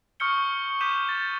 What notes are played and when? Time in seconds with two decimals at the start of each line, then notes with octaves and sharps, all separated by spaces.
0.20 C#6 D#6 F6 G6 C#7 G7
0.81 D6 D#6 G6 B6 D#7 E7
1.09 A6